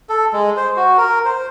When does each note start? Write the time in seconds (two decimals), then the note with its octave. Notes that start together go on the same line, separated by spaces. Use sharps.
0.09 A4
0.33 G#3
0.57 C5
0.77 F#4
0.98 A#4
1.25 C5